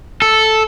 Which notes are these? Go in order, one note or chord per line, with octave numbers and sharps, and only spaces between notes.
A4